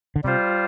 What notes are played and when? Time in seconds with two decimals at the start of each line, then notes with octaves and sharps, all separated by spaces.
0.16 D3
0.24 C3 G3 F4 C5